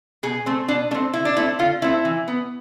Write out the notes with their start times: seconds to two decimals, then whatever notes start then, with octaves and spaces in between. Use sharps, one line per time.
0.23 B2 G#4
0.46 A3 C4
0.68 B2 D4
0.91 A3 D4
0.94 C4
1.13 D3 E4
1.25 D4
1.37 A3 C4 E4
1.59 D3 F4
1.82 A3 C4 E4
2.05 E3
2.28 B3